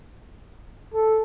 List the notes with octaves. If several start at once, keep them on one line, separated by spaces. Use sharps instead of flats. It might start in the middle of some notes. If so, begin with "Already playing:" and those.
A4